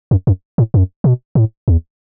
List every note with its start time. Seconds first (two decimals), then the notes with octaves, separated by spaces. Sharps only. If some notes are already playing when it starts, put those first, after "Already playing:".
0.11 F#2
0.27 F#2
0.58 A2
0.74 F#2
1.04 B2
1.35 A2
1.68 E2